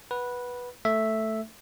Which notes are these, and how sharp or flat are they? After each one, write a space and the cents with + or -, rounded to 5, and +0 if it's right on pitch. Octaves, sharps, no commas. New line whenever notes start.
B4 -10 F#5 +0
A3 +0 E5 +0